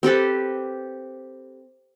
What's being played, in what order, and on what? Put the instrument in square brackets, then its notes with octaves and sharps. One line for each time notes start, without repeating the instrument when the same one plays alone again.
[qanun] C4 G4 A4 B4